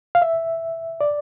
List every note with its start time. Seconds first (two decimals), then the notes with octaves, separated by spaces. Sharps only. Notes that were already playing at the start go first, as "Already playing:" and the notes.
0.15 F5
0.22 E5
1.01 D5